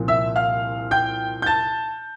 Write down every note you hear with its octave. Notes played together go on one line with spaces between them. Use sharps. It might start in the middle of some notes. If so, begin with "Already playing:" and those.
Already playing: C2 A#2 F3
E5 E6
F5 F6
G5 G6
G6
A5 A6